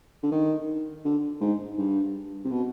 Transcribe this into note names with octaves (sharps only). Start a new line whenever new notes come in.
D3
D#3
D3
G#2
G2
C3
B2